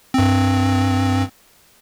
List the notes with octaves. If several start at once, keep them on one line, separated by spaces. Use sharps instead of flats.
G2 C4